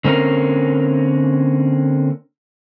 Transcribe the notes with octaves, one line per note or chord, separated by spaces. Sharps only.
D3 A#3 C4 C#4 A#4